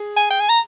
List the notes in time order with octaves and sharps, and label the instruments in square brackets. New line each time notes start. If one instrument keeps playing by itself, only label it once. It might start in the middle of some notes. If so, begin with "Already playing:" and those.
Already playing: [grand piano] G#4
[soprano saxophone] G#5
G5
G#5
A#5